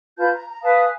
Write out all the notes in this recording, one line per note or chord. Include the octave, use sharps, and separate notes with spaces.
F4 B4 A5 G6
A#5
A#5
B4 F5 A5 D#6
G#5